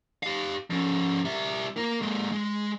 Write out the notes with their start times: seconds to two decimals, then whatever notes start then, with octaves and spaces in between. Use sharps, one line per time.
0.23 G4 F5
0.70 F3 C#4
1.25 G3 E5
1.77 A#3 A#4
2.01 G#3 A#3
2.32 G#3